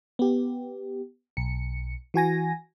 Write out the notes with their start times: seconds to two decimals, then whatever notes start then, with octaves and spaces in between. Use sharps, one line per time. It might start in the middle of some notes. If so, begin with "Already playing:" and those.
0.19 B3 G4
1.37 B1 C#7
2.14 E3 F#4 G#5 A#6